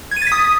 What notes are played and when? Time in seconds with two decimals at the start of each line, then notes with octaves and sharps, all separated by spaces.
0.11 G#6
0.16 D#7
0.22 A6
0.27 B6
0.32 D#6